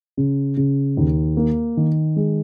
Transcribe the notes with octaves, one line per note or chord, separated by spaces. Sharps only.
C#3
C#3
D#2
A#3
D#3
G#3